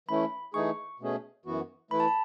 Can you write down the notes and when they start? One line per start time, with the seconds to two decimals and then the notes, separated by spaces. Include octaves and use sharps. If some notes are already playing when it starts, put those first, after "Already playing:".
0.09 E3 A3 C#4 E4 B5
0.54 E3 A3 D#4 G#4 C#6
1.00 B2 A3 C#4 G#4
1.45 F#2 E3 B3 F#4
1.91 E3 A3 E4 B4 B5
2.00 A5
2.08 B5